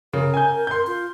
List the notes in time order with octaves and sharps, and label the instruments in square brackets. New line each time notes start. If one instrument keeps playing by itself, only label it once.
[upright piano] C#3 [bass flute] A#4
[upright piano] G#5 G6
C6 G6
[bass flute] F4